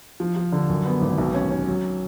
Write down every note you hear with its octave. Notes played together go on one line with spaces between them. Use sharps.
F3
F3
D3
F#2
B3
G#1
B1
C#4
C#4
F#3